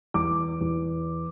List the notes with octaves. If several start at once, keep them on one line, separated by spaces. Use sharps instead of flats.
E2 D6
E2